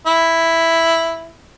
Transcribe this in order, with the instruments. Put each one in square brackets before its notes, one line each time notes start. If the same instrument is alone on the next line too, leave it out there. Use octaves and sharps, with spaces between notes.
[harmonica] E4